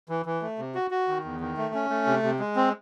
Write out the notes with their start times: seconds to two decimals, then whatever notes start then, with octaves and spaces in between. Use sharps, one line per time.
0.09 E3
0.26 E3
0.42 A3
0.59 C3
0.75 F#4
0.91 F#4
1.08 D#3
1.24 E2
1.40 D#3
1.57 A3
1.74 C#4
1.90 A3
2.07 C3
2.23 C3
2.39 G#3
2.56 C4